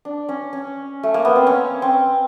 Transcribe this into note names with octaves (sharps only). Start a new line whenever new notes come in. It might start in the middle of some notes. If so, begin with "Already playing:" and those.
D4
C#4
C#4
A3
A#3
B3
C4
C#4
C4